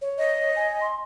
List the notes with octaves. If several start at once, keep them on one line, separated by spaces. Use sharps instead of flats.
C#5
D#5
G#5
C6